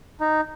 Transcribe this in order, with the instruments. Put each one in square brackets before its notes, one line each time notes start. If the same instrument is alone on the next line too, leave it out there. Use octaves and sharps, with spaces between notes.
[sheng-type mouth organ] D#4